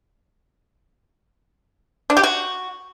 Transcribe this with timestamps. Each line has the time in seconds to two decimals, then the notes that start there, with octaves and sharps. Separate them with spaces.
2.10 D4
2.17 G4
2.23 F#4